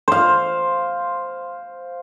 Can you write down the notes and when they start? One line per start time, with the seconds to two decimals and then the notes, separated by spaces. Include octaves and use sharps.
0.08 C5 F5